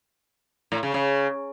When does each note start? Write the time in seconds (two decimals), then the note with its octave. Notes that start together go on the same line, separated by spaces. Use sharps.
0.72 A2
0.83 C#3
0.94 C#3